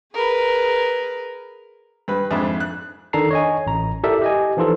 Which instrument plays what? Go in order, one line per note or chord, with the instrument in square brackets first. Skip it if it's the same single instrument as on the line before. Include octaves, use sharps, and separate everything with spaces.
[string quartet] G#4 A#4 B4
[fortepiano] G2 B4
F2 G#2 D4 E5 B5
F#6
[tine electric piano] D#3 D4 A4 A5 A#5 C7
C#5 D#5 G#5
A1 A#5
E4 G4 A4 A#4 D5 E5
G4 D#5 G#5
E3 F3 D#4 F4 A4